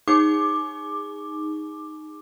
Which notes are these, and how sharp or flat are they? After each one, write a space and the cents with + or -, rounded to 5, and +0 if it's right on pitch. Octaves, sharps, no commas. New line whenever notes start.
D#4 +0 G#4 -20 D6 +10